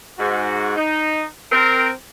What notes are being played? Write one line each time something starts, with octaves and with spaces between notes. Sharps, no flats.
G#2 F#4
D#4
C4 A#4